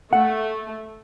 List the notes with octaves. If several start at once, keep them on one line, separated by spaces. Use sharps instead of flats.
A3 F#5